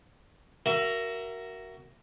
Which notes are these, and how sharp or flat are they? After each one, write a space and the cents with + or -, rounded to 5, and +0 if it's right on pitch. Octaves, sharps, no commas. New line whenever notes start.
F#4 +15 A#4 +0 E5 +30